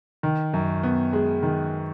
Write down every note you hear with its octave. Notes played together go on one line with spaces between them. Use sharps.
D#3
F#2
B3
G#3
D#3